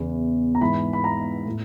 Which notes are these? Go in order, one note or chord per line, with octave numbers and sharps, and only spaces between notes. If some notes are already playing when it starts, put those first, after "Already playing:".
Already playing: E2 C#3 E3
A#5
G#2 E3 B5
B5
A#5
A2